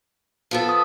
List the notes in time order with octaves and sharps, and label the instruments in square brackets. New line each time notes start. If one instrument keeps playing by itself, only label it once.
[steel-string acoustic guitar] F3 B3 A4
[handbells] D#6